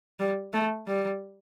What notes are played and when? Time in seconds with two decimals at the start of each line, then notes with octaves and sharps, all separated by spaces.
0.20 G3
0.53 A3
0.87 G3